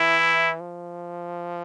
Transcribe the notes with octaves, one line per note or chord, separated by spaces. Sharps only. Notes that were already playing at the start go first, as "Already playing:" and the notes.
Already playing: E3 E4
F3